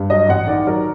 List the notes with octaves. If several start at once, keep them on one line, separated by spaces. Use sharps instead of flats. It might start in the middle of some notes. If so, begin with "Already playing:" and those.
Already playing: G2
F#3 D#5
A1 F#5
D#3 D5
F#3 A#4